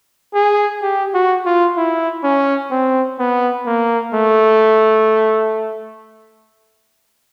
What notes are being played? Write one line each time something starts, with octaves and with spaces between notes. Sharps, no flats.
G#4
G4
F#4
F4
E4
C#4
C4
B3
A#3
A3